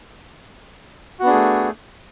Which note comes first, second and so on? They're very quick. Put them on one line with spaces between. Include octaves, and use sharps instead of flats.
F#4 B3 D4 G#4 A3